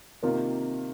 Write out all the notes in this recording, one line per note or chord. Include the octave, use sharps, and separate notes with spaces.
C3 D#3 A#3 F4